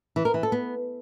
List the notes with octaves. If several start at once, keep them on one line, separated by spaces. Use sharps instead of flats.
E3
A#4
E3
A4
B3